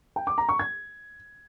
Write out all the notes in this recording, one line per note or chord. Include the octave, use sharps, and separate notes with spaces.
G5
D6
A#5
C#6
G#6